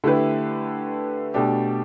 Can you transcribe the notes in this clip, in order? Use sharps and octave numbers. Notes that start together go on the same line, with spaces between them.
D3 A3 E4 G4 B4
B2 A3 D4 G4